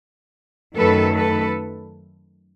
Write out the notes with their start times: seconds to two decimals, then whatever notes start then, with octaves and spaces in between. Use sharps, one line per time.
0.76 F#2 D#3 F#3 A3 A4 B4
1.16 A4 B4